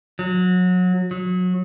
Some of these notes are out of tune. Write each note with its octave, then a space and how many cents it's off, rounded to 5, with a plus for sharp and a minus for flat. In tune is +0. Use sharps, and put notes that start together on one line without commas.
F#3 -25
F#3 -25